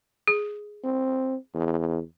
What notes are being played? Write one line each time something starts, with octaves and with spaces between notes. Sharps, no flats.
G#4
C4
E2